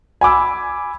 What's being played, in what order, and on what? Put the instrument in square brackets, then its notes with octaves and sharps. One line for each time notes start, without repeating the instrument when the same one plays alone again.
[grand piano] G#5 B5 D6 E6